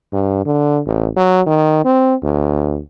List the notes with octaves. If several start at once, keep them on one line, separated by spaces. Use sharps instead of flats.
G2
D3
A1
F#3
D#3
C4
D2